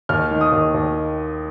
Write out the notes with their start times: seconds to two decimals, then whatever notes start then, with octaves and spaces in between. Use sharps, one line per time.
0.09 D#2 F6
0.31 D#3
0.41 D#6
0.52 D#2
0.74 D#2